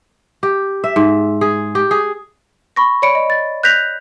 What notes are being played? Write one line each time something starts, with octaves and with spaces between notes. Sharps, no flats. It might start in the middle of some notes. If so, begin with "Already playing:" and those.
G4
E5
G#2
G#4
G4
G#4
B5 C#6 A#6
C#5 D5 B5 C#7 D7
D#5
A6
F#6 G6 A#6 B6 F7